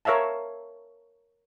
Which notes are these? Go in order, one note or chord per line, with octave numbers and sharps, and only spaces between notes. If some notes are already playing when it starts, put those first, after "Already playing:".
A#4 C#5 E5 F5 A5